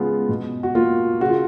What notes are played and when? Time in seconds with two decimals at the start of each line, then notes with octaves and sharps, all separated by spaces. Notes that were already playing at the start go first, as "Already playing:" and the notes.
Already playing: C#3 G#3 B3 F4
0.29 B2
0.63 F#4
0.75 A#3 F4
1.21 C#3 F#4
1.29 F4